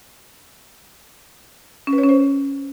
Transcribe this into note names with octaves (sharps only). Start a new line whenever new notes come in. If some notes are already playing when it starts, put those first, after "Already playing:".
C#4
B4
C#5
C#4
C5